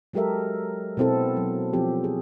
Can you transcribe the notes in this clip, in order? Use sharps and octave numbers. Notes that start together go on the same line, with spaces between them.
F#3 G#3 G4 A4 A#4 E5
B2 B3 C4 E4 A4
F#3
F3 C4 G4
G#4